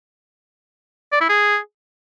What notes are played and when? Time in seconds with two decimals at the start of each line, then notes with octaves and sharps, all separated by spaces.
1.12 D5
1.21 E4
1.29 G#4